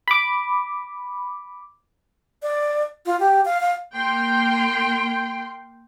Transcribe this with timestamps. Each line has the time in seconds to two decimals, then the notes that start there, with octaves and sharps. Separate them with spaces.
0.08 B5 D6
2.43 D5
3.06 F4
3.20 G4
3.45 F5
3.61 F5
3.96 A#3 G5 C6